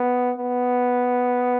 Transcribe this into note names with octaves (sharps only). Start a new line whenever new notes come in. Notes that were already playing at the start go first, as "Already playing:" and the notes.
Already playing: B3
B3